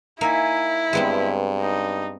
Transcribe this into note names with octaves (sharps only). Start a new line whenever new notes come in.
A#3 D#4 E4 E5 G#5
G2 G#3 B3 C4
D#4